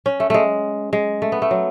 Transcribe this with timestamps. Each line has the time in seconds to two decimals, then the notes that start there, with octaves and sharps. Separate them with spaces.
0.06 C#4
0.20 A3
0.30 G#3 A3
0.93 G#3
1.22 A3
1.32 B3
1.42 A3
1.51 F#3